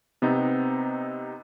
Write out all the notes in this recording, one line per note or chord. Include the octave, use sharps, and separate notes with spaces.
C3 B3 C4 D#4